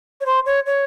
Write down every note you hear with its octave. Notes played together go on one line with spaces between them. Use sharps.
C#5
C5
C#5
C#5